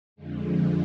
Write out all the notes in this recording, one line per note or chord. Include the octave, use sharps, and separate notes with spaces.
F2 D3 F3 G#3